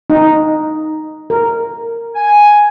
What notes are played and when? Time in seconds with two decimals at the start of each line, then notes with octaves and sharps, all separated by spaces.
0.10 D#4
1.30 A#4
2.16 G#5